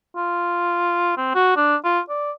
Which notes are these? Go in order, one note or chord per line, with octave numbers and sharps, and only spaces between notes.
F4
C4
F#4
D4
F4
D5